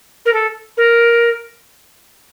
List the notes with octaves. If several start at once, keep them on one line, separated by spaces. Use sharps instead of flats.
A#4
A4
A#4